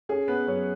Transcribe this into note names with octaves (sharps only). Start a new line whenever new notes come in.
C#4 G#4
B3 C#4 B4
F#2 C#4 C#5